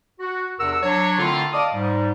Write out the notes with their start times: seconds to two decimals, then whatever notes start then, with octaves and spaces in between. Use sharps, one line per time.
0.20 F#4
0.59 E2 C3 D4 A#4 F#5 E6
0.83 F#3 D4 C#5
1.19 D3 D#3 A3 C4 E4 F4
1.53 D5 D#5 F5 A5 D6 D#6
1.74 G#2 G3